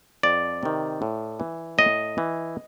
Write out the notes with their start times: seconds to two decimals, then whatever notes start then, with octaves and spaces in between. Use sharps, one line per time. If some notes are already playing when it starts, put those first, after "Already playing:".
0.23 F2 D5
0.63 C3 D#3
1.02 A2
1.40 E3
1.78 A2 D#5
2.18 E3